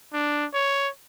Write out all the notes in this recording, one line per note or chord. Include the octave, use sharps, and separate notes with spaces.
D4
C#5